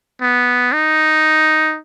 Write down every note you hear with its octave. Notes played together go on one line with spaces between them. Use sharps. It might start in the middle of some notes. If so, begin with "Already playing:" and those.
B3
D#4